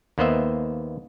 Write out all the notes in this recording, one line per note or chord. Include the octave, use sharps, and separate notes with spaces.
D#2 A#3 B3 C5 D#5 E5